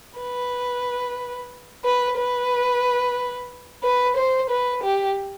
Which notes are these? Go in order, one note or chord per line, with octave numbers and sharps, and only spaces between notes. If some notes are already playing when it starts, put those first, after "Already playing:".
B4
B4
B4
B4
C5
B4
G4